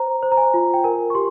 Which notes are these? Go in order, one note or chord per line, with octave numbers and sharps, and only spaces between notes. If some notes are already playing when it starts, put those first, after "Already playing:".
Already playing: C5 A#5
C5
A#5
G#5
F4
G5
A#4 G#5
C#6
G4 C6